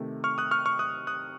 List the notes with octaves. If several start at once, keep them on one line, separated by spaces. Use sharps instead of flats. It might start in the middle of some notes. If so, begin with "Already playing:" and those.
Already playing: C3 D#3 A3
C#6 F6
D#6 F#6
C#6 F6
C#6 F6
D#6 F#6
D#6 F#6